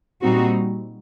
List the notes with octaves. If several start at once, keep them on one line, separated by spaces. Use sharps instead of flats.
A#2 G3 C4 D#4 F#4